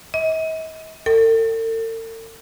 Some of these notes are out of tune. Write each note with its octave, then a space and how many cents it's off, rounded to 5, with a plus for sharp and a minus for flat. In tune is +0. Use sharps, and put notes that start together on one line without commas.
D#5 +45
A4 +45